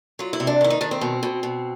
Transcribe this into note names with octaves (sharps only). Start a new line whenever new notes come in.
F#3 F4
E4
C3
D4
D#3 E4
D#4
D#3 D4
C4
B2
B2
B2